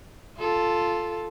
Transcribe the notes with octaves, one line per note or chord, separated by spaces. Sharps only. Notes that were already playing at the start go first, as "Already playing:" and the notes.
F4 A4